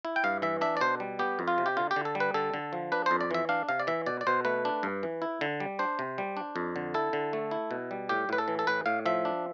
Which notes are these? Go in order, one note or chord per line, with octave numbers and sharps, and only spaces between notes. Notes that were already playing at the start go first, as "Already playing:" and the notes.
E4
G5
G2 F5
E3 E5
D4 E5
D5
B2 C5
G3
B3 G4
F2
F4
C3
G4
D3 F4
G4
D3
A4
G3
B4
D3 A4
D3
F3
D4 B4
F2 C5
D5
E3 E5
D4 F5
C3 F5
D5
E3 E5
B2 D5
D5
B2 C5
A3 B4
D4
G2
E3
E4
D3
G3
D4 C5
C3
G3
D4
F2
D3
E4 A4
D3
A3
E4
B2
G3
A2 G4
A2 B4
A4
E3
A4
A2 B4
A2 F5
F3 E5
D4